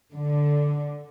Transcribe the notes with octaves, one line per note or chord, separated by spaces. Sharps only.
D3